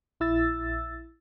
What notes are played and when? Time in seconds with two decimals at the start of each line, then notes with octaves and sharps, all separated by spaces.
0.20 A#1 E4 E6 A6